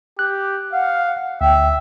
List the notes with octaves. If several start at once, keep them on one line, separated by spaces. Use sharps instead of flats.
G4 F#6
F5 F#5
D2 E5 G5